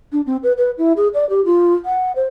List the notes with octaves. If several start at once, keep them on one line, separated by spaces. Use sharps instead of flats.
D4
C4
B4
B4
E4
G#4
D5
G4
F4
F#5
C5